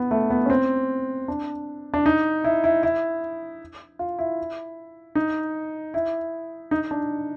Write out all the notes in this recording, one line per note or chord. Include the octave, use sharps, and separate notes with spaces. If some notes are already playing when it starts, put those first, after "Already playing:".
Already playing: B3
A3
B3
C#4
C4
D4
D4
D#4
E4
E4
E4
F4
E4
D#4
E4
D#4
D4